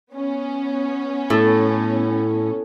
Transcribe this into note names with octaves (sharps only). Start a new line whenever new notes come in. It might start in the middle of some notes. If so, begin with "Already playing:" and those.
B3 C#4
A2 E4 A4